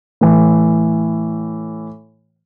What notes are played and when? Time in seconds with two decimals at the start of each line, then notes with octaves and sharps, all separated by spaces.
0.21 A2 E3